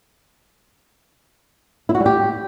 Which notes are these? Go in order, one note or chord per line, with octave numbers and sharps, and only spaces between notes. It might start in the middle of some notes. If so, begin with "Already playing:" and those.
E4
F#4
G3
G4